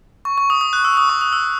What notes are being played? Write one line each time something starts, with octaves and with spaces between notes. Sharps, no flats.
C#6
C#6
D#6
D#6
F#6
E6
D#6
C#6
D#6
E6